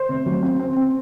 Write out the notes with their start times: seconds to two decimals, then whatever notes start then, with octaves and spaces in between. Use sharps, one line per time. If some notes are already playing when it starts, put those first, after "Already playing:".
Already playing: C5
0.09 C3
0.26 F#3
0.43 C4
0.60 C4
0.77 C4